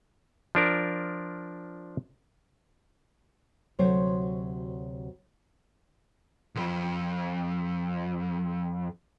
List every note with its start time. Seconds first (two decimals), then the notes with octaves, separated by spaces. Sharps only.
0.55 F3 D4 A#4
3.79 D2 C3 F#3 C5 C#5
6.55 C2 F2